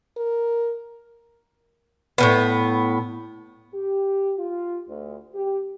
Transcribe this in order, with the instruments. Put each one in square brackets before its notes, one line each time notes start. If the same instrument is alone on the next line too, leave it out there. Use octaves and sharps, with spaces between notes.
[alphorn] A#4
[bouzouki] A2 C#3 B3
[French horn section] G4
F4
D2
G4